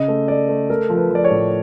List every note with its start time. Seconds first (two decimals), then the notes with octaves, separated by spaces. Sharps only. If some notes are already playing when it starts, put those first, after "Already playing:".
Already playing: C#3 D#5
0.08 A3
0.28 A3 D5
0.49 A3
0.70 A3 A#4
0.90 F3
0.97 B4
1.10 F3 D5
1.24 C#5
1.30 A2